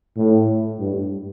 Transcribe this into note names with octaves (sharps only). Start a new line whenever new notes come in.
A2
G2